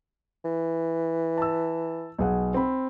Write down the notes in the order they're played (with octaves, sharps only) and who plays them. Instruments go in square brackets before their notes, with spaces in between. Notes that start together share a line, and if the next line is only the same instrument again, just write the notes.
[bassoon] E3
[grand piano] A5 E6
B1 G#4 F#5
C4 B5